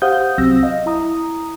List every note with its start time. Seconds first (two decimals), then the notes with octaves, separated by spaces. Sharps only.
0.02 G4 C5 F5 F#5 D#6 G6
0.38 C2 F#3 C4 E6 A#6
0.63 D#5 F5
0.86 E4 A#5 D#6